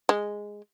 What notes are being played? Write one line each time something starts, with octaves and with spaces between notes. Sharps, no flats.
G#3